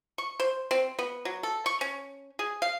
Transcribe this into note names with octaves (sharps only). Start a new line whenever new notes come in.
C#6
C5
C4
B3
F#3
A4
C#6
C#4
G#4
F5